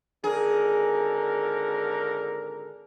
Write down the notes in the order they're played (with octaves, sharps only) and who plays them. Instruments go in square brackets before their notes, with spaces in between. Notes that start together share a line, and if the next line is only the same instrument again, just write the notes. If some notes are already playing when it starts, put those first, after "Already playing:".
[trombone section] G#1 D3 A#4 [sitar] G#4